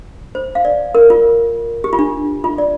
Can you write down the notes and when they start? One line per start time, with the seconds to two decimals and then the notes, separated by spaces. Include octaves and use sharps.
0.35 C5
0.55 F5
0.65 D5
0.95 A#4
1.10 F4
1.84 G4
1.93 F4
1.99 D4
2.44 F4
2.58 D5